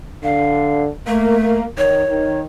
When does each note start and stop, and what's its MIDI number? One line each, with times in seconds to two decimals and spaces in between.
0.23 0.88 50
0.23 0.83 77
1.07 1.56 57
1.07 1.36 58
1.43 1.66 58
1.78 2.02 51
1.78 2.39 73
2.09 2.44 51